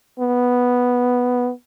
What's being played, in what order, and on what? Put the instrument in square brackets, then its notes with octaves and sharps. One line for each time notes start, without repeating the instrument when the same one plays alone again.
[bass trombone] B3